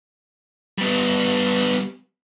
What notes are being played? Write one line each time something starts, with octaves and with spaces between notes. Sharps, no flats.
G3 B3